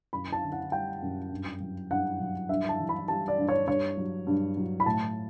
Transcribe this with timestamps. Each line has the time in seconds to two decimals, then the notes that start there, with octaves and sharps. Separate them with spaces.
0.13 F#2 B5
0.33 A5
0.42 D3
0.52 F#5
0.71 G3 G5
1.02 F#2
1.31 G2
1.60 F#3
1.91 G2 F#5
2.20 F#3
2.49 G2 E5
2.69 A5
2.78 E3
2.89 B5
3.08 G3 A5
3.28 D5
3.38 G2
3.49 C#5
3.67 G2 C#5
3.97 F#3
4.27 G2
4.57 F#3
4.80 B5
4.86 A2 A5